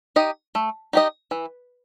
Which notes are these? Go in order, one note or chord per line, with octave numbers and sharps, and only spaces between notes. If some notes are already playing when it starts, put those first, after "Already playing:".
D#4 G4 D#5
A3
D#4 G4 D#5
E3